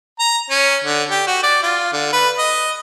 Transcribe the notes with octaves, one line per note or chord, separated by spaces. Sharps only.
A#5
C#4
D3
G4
F#4
D5
F4
D3
B4
D#5